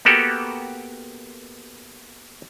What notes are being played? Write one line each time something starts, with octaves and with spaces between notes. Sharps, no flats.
A#3 B3 F#4 G4 A4